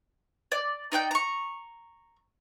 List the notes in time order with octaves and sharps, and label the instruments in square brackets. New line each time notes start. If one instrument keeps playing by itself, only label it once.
[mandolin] D5
D#4 D5 G5 G6
A#5 C#6